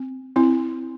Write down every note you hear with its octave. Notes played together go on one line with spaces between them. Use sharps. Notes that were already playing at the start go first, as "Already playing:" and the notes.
Already playing: C4
C4 E4